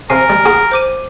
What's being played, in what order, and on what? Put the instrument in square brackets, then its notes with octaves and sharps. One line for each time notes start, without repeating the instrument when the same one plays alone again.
[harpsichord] C3 C6 [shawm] A#4 [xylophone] G#5
[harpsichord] G3
F#4 G#4
[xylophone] C5 D6 D#7